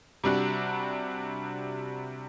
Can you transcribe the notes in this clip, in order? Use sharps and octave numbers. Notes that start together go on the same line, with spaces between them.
C3 G3 D4 F#4